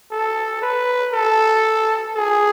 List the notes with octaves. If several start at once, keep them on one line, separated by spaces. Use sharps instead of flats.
A4
B4
A4
G#4